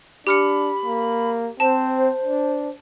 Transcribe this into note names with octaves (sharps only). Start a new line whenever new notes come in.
D4 G4 B5 F6 C#7
A#3
C4 C5 A5
D4